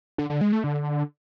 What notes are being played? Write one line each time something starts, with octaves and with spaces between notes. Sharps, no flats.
D3
D3
G#3
A3
D3